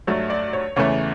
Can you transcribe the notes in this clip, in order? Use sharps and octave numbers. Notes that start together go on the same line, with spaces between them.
G2 F#3 A3 C#5
D5
C#5
E2 C#3 E3 A3 C#5